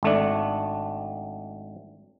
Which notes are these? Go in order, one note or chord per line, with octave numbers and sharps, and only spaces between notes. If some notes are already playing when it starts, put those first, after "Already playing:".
G#1 A3 D4